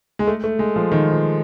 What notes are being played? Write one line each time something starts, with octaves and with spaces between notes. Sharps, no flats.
G#3
A3
A3
G#3
F3
D#3
F3